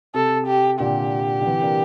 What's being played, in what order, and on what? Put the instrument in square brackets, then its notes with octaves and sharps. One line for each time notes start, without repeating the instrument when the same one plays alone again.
[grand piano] C3 [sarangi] A4
[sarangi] G4
[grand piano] A#2 D3 [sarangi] G4
[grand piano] D3
C3 E3
A#3 D4